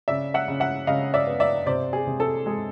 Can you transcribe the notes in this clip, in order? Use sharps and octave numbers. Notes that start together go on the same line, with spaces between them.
C#3 D5 E5
E5 F#5
C#3
E5 F#5
C#3 D#5 F5
D5 E5
B3
D5 E5
C3 C5 D5
G#4
C3
A4
G#3 G#4